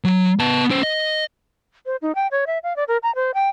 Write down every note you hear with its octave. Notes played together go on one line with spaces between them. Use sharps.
F#3
B3 A5
C#4 C5
D#5
C5
D#4
G5
C#5
E5
F5
D5
A#4
A#5
C5
G5